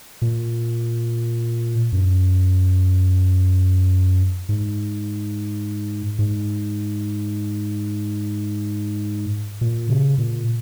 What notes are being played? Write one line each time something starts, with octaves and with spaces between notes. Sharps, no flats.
A#2
F#2
G#2
G#2
A#2
C#3
A#2